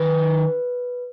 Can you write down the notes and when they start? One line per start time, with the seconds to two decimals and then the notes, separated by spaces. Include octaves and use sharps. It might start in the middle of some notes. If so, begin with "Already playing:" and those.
Already playing: D#3 B4